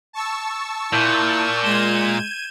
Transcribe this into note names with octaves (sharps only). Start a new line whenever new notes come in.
A5 C#6 E6
A#2 E4 G6
G#3 G#6 D#7 E7 G7